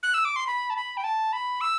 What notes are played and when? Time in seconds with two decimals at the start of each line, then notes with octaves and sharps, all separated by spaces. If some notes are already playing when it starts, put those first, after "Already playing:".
0.03 F#6
0.14 E6
0.25 D6
0.36 C6
0.47 B5
0.70 A5
0.76 B5
0.97 G5
1.04 A5
1.33 B5
1.61 E6